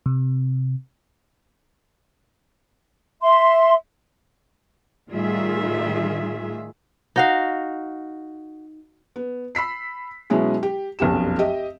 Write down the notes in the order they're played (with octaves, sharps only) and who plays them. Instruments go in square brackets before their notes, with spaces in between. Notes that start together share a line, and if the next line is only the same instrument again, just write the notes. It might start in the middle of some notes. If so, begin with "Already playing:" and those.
[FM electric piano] C3
[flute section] E5 C6
[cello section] A2 D#3 G3 F4 G#4 E5
[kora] D#4 F#4 F5
[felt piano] B3
B5 E6 B6 C7
B2 F#3 G#3 C#4 E4 G#4
G4
F1 B1 F#2 G4 E7
G4 D#5 E5